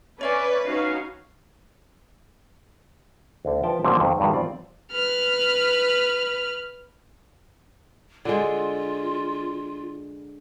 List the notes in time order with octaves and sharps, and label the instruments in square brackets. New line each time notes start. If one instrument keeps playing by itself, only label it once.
[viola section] C#4 [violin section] B4 [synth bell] C#5 E5 G#5 [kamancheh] D5
[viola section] C#4 F#4 F5 [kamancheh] D#4
[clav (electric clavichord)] D2 D3
F3 B4 G5 A5
A#2 D3 F3 F#3 A#3 C4
F2 D#3
G2 D#3 G3 G#3 F#4
C4 F4 D5
[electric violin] B4 F6
[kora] D3 G#3 [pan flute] F4